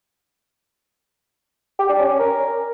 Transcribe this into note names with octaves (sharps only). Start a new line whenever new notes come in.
G4
D4
C#4
C#4
A#4